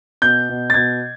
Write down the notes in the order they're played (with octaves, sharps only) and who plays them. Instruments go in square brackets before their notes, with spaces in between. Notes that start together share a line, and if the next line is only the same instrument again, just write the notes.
[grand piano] B2 G6
B2
A6
B2 G#6